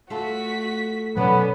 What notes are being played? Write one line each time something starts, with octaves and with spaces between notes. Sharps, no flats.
A3 F4 F#4 A4 B6
B2 F#3 B3 C#4 A4 D5